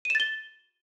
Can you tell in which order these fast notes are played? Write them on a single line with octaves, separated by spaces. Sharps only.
D#7 E7 A6 G7